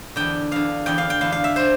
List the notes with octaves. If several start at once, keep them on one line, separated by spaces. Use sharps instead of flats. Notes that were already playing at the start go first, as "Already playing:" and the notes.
E2 D3 G5
E2 D3 F5
E2 D3 G5
F5
G5
E2 D3 F5
F5
E5
D3 C5